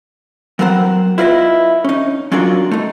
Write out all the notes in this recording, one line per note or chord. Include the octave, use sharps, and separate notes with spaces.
F#3 B3 C4 A#4 C5 F#5
E4 F4 B4 D5 D#5
C#4 D#4
F#3 C#4 D4 F4 F#4 A#4
A3 D#4